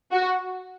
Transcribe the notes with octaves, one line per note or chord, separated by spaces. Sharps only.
F#4